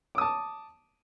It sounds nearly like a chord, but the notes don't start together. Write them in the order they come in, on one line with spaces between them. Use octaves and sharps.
D6 D#6 A5